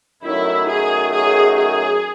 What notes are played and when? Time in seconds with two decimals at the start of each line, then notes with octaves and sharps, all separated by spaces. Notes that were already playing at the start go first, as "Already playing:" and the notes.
0.24 F#2 D#3 F#3 A3 E4
0.68 G#4
1.12 G#4
1.57 G#4